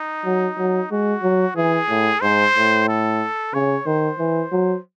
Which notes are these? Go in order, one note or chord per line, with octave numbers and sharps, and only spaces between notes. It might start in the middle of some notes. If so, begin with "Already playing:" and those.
Already playing: D#4
F#3
F#3
G#3 F#4
F#3
E3 G#4
A2
G#2 C5
A2
A4
C#3 C#5
D#3 C5
E3
F#3